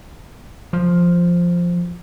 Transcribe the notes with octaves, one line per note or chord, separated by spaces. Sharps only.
F3